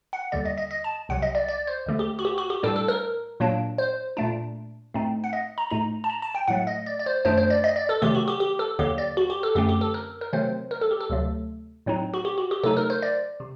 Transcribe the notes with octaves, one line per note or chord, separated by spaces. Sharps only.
F#5
D#2 D3 G3 D5
D#5
D#5
D#5
A5
C2 C3 F#3 F#5
D#5
D5
D5
C5
D#2 D3 A3
G4
F#4
G4
F#4
G4
A2 G3 D4 A4
A4
A#4
A#2 F#3 A#3 D4
C5
A#2 A3 D4
A2 A3 C4 D#4
F#5
D#5
A#5
A2 A3 D#4 A#5
A5
A#5
A5
G5
A2 F#3 A3 F#5
D#5
D5
D5
C5
F#2 D#3 A3 D4 C5
C5
D5
D#5
D5
A4
C3 D#3 F#3 A3 G4
F#4
G4
G4
A4
D#2 D3 F#3 A#3 G4
D5
F#4
G4
A4
F#2 D3 A3 C4 G4
G4
A4
A#4
A#4
C3 D#3 F#3 A3 C4 C5
A#4
A4
G4
A4
D2 C3 F#3 A3
A2 F#3 C4 D#4
F#4
G4
F#4
G4
C3 F#3 A3 D#4 A4
A#4
C5
D5
C3